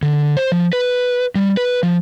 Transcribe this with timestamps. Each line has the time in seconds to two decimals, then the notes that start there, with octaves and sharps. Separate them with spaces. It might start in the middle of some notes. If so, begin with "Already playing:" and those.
0.02 D3
0.37 C5
0.52 F3
0.73 B4
1.35 G3
1.57 B4
1.83 F3